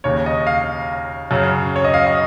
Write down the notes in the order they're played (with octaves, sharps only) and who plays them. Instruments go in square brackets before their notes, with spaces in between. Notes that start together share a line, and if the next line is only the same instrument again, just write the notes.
[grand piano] D#2 C#3 C#5
D#5
F5
F#2 C#3
C#5
D#5
F5
D#5